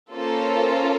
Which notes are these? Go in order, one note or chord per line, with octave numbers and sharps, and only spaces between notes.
A#3 C#4 F4 A4 C5